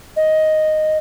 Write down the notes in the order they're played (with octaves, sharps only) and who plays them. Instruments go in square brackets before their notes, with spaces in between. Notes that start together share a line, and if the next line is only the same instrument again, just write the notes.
[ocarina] D#5